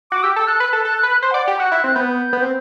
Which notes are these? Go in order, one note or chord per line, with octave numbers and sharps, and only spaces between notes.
F#4 D6
G4 E6
A4 E6
A4 F#6
B4
A4
A4 F#6
F#6
B4
F#6
C5 C6
F#5
D5
F#5
G4 G5
F#4 F#6
E4
C4 F#6
B3 G6
B3
C4